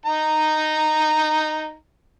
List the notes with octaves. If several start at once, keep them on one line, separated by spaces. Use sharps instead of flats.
D#4 A#5